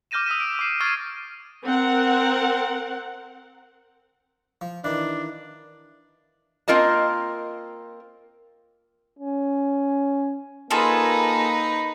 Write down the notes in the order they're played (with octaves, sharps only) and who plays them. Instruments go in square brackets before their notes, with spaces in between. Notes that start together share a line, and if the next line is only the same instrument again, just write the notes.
[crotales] D6 F6 G6 A#6 D#7 E7
D#6 E6 B6 D#7
D7
D6 D#6 C7
C#6 F6 G#6 A6 C7 D#7
[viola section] C4 A#4 F#5
[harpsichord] F3
[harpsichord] D#3 E3 [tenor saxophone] D4
[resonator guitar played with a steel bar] A#3 C4 F4 A#4 D#5 A5
[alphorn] C#4
[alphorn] A#3 [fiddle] D#4 B4 [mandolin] F4 G#4 A4